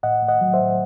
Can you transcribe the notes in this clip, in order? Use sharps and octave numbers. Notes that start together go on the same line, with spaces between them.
A2 D#5 F#5
A2
D#5 F#5
F#3
C5 E5
A2